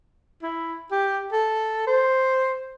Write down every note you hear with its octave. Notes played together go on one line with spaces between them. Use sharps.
E4
G4
A4
C5